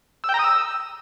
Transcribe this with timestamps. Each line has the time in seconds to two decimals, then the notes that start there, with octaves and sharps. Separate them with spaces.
0.24 E6
0.29 G5
0.34 A#5
0.39 D#6
0.44 E6